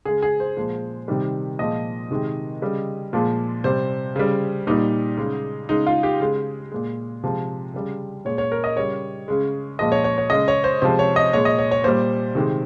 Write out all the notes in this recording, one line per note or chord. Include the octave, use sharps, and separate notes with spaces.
C#3 G#3 G#4
G#4
C5
A#2 F3 G#3
C3 D#3 G3
A#2 F3 G#3 D#5
C3 D#3 G#3
C#3 G3
A#2 F3 G#3
C3 G3 C5
C#3 G3
A#2 G3 D#4
C#3 G#3
C#3 G#3 D#4
F4
G4
C#3 G#3
A#2 G#3
C3 F3 G#3
C#3 G3
A#2 G#3 C#5
C#5
A#4
D#5
C#3 G3 C#5
C#3 G#3
A#2 F3 G#3 D#5
C#5
C#5
C#5
C#3 G#3 D#5
C#5
C5
C3 F3 G#3 C5
C#5
D#5
A#2 G#3 C#5
D#5
C#5
C#5
A#2 G3 C5
C3 D#3 G#3